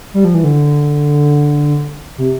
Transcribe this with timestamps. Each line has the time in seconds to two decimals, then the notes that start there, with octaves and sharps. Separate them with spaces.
0.14 G3
0.24 F3
0.34 E3
0.44 D3
2.18 C3